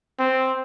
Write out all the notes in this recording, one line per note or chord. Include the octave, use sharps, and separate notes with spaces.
C4